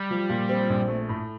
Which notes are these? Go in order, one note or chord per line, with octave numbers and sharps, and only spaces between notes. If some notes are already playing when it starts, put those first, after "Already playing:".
Already playing: G3
F3
A#2
C4
A#1
A3
A2